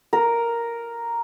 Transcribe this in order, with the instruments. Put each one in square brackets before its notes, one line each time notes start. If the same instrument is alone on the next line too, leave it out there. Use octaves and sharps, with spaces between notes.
[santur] A#4